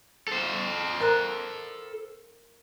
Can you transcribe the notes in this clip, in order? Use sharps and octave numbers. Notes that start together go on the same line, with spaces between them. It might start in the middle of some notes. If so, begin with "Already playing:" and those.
A4 C5
A#4 A#5 F#6